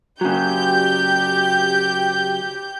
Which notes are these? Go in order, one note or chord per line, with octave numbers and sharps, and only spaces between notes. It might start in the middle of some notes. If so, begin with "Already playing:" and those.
C#3 F#3 G4 G6